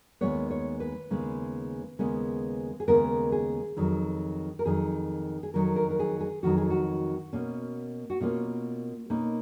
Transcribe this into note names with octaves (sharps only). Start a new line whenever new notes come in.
D#2 C#3 G#3 B3 C#5
C#5
B4
D#2 C#3 G#3 B3
D#2 C#3 G#3 B3
G#4
D#2 C#3 G#3 B3 A#4
G#4
F2 D#3 F#3
A#4
F2 D#3 F#3 G#4
G#4
F2 D#3 F#3 A#4
A#4
A#4
G#4
G#4
F2 D#3 F#3 F#4
G#4
F#4
B2 A#3 C#4
F#4
B2 A#3 C#4 F4
B2 A#3 C#4 D#4